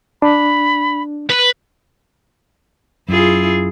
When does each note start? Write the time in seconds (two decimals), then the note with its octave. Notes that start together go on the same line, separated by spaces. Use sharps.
0.22 D4 B5
1.30 B4
3.09 F#2 E4 F4 G#4